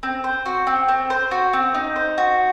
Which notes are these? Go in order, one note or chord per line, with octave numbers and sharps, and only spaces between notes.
C4
C5
F#4
C4
C4
C5
F#4
C4
D#4
C5
F#4